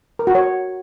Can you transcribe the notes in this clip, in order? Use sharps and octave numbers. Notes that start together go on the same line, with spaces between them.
A#4
F#4
C#5